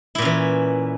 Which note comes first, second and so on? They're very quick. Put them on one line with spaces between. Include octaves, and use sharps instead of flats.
E4 A#2 C#4 E3